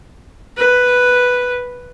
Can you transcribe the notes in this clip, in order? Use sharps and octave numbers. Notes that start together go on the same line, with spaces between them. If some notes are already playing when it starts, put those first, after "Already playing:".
B4